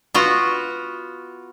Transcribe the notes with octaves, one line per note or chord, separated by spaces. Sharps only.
B3 F4 F#4